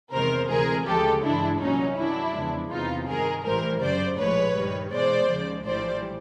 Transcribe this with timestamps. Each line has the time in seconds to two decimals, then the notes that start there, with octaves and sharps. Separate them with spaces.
0.13 E2 C3 D#3 G#3 A#4 C5
0.50 D2 C3 E3 G#3 G#4 A#4
0.86 D2 C#3 F3 G#3 G4 A4
1.23 G2 E3 G#3 D4 E4
1.60 C2 A#2 F#3 C#4 D#4
1.97 G2 D#3 F#3 D4 E4
2.34 E2 C#3 F3 G#3
2.71 E2 C3 E3 D#4 F4
3.08 G2 D#3 G#3 G#4 A#4
3.45 A1 A2 E3 G3 A#4 C5
3.81 G1 F#2 C#3 C5 D5
4.18 A#1 A2 F3 G#3 B4 C#5
4.55 G2 D#3 G3
4.92 E2 B2 G#3 C5 D5
5.29 D#2 C#3 F3 G#3
5.66 A#1 A2 E3 G3 C5 D5